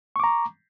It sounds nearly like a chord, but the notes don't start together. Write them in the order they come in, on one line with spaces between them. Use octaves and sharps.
C#6 D6 A#5